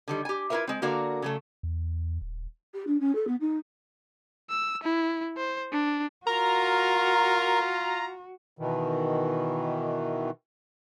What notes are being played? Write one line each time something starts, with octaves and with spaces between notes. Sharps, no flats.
D3 D#3 G3
G4 G#5
E4 F4 G4 A#4 B4 E5
G#3 C4
D3 A#3 F#4 A#4 D5 F5
C#3 F#3 A3
E2
D#1
G4
D4
C#4
A4
B3
D#4
E6
E4
C5
D4
F4 F#4 A#4 A#5
B2 D#3 E3